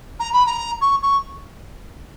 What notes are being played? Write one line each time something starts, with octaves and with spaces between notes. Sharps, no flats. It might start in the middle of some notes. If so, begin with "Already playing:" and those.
A#5
B5
A#5
C#6
C#6